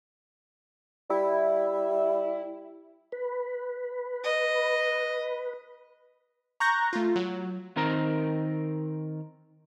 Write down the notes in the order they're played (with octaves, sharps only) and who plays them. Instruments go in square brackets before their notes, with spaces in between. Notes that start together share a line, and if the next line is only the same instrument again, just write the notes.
[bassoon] G3 [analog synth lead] E4
[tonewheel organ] B4
[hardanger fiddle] D#5
[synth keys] A#5 C#6 F#6 G6 A#6
A3 F4
F#3
[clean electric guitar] D#3 C4 A#4 A#5